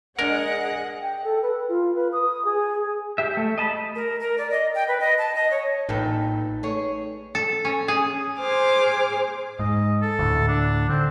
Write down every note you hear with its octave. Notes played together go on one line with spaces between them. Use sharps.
G#3 D4 G#4 A#4 D#5 F#5
G5
A4
B4
F4
B4
D#6
G#4
G4 E5
A3
D#5 A5 B5
A#4
A#4
D5
D#5
G5
B4
D#5
A5
D#5
C#5
A1 A#2 D#4 A4 B4 G5
A3 G#4 C#5
A4
C#4
G#4
G#4 C5 G#5 D6 F6
G#2 D#5
A4
D2 A2
D4
D3 C4